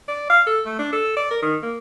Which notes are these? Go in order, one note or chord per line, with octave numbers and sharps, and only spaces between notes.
D5
F5
A4
A3
D4
A4
D5
A#4
D#3
A#3